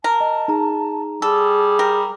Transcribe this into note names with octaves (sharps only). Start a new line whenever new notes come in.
A#4 A5
D#5
D#4 G#4 A#5
G3 G#4 A4 E6
G4 A#4